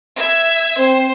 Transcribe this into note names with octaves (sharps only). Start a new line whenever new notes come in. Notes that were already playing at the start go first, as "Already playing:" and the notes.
E5 G#6
C4 C5